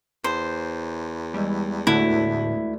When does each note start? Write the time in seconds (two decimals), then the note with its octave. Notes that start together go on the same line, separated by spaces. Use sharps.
0.24 E2 C5
1.34 E3 G3 G#3 E4
1.87 D2 A2 D3 A3 E4 B4 F#6